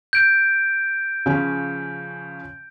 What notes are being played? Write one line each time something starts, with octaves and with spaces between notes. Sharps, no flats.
G6 D7
C#3 F3 C#4